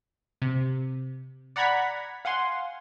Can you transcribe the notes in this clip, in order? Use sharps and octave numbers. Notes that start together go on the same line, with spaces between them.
C3
D5 F#5 A#5 B5 G#6 B6
F5 F#5 G#5 C6